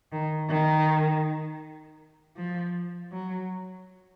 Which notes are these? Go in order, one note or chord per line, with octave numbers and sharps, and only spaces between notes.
D#3
D#3
F3
F#3